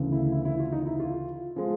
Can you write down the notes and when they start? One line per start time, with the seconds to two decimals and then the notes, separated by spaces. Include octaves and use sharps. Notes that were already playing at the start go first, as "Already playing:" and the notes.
Already playing: D2 C#3 E3
0.12 E4
0.32 E4
0.45 E4
0.59 F4
0.72 D#4
0.86 E4
1.00 F4
1.56 F3 G#3